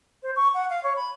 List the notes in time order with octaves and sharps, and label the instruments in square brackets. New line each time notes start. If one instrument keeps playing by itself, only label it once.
[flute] C5
C#6
F#5
F5
C#5
B5